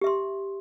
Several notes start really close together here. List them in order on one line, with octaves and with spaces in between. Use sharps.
G4 E5 C6